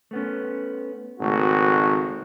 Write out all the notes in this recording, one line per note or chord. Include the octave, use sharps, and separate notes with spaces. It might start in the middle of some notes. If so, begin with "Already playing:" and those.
A3 B3 C#4
G#1 C#2 A3 F#4